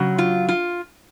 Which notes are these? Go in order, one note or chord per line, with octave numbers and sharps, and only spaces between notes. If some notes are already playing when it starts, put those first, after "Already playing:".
Already playing: C#3 F#3
F4
F4